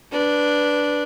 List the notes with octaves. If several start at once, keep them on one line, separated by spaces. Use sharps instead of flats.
D4 B4